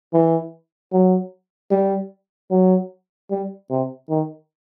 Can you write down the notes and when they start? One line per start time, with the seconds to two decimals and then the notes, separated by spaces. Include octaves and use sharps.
0.13 E3
0.92 F#3
1.71 G3
2.51 F#3
3.31 G3
3.70 C3
4.10 D#3